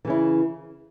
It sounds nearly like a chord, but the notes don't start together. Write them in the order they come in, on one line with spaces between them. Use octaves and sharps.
E3 C#3 E4